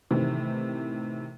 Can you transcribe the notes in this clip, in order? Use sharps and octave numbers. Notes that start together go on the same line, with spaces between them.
A2 C3 D#3 E3